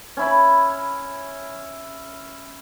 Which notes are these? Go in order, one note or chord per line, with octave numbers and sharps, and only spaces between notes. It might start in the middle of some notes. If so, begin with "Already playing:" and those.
C#4 E4 B5